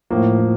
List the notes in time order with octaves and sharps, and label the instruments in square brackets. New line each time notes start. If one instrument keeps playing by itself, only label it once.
[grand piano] A2 F3 A#3
A2